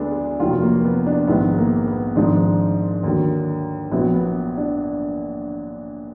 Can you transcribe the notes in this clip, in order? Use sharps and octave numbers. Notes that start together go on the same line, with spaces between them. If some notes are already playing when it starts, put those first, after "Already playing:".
Already playing: D2 D3 G#3 B3 D4
G#4
F1 D#2 D#3 F#3 F4
A#3
B3
D4
A#1 G#2 D#3 G#3 B3
A#3
B3
G#1 G#2 F3 G#3 D4
D#2 D3 F#3
A#1 A#2 F#3 B3
B3
D4